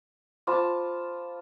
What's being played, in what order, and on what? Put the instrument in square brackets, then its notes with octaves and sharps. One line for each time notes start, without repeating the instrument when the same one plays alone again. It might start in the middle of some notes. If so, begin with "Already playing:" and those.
[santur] F4 A5 [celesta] C5 B5 D6